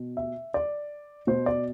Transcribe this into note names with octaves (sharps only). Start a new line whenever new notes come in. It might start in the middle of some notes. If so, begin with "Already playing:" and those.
Already playing: B2
E5
D5
B2 C5
D5